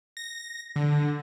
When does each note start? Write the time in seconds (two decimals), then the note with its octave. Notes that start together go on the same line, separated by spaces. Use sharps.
0.17 A#6
0.76 D3